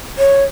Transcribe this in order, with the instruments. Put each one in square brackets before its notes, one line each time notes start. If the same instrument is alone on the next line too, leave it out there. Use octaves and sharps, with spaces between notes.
[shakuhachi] C#5